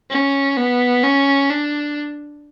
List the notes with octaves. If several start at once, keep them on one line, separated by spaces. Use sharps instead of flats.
C#4
B3
C#4
D4